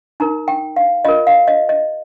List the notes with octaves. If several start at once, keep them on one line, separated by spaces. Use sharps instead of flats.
D#4 A#4 A#5
G5
F5
F4 A#4 D#5
F5
D#5
D#5